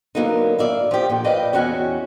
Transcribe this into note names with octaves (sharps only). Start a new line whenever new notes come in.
D3 F#3 A#3 B3 D#4
D5 E5 F5
F3 G4
A#2 D3
B4 D5 D#5 F5 G5
E2 C#4 F#4 F#5 G#5